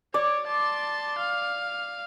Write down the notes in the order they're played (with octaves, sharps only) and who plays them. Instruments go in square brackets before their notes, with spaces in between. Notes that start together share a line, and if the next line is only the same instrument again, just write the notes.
[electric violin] C#5 [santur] D5
[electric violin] A5 C6
F5